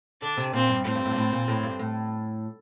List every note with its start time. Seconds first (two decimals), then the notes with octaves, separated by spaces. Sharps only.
0.22 D3 D4
0.38 C3
0.53 A#2 C4
0.69 G2
0.85 A2 C4
0.95 G2
1.06 A2
1.11 G2
1.16 A2
1.33 A#2
1.48 A2
1.63 G2
1.79 A2